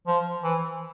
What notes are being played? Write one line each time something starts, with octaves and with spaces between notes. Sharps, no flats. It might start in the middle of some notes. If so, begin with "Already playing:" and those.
F3
E3